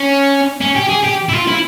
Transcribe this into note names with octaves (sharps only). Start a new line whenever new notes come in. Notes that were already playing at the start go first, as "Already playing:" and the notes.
Already playing: C#4
C#4
G4
G#4
G4
E4
F4
E4